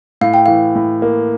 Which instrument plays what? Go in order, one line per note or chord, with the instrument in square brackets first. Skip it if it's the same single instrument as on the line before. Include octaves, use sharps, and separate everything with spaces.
[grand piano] A2 [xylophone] F5
[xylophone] G5
[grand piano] E3 [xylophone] F5
[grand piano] A2
A#3